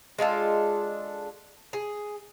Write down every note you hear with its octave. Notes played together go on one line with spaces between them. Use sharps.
G#3 D4 F4 A4
G#4